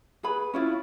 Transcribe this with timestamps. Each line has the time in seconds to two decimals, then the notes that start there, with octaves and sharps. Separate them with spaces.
0.23 G#4 B4 B5
0.54 C#4 E4 F4